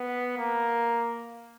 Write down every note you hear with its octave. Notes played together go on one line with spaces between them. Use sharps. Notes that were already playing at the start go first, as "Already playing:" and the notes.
Already playing: B3
A#3